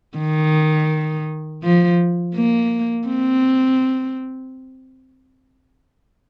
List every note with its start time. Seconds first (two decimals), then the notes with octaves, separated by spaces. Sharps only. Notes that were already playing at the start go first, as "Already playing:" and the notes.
0.18 D#3
1.63 F3
2.35 A#3
3.08 C4